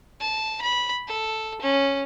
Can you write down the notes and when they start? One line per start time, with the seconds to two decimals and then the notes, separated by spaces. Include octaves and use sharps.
0.20 A5
0.62 B5
1.08 A4
1.62 C#4